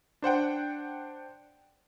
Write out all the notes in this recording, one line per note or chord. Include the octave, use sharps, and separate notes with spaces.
D4 C5 F#5 G5